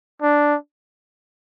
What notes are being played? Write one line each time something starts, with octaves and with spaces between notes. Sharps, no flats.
D4